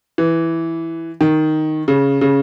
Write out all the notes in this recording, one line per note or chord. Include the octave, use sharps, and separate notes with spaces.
E3
D#3
C#3
C#3